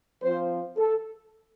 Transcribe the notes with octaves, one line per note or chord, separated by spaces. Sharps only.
F3 C4 F4 C5
A4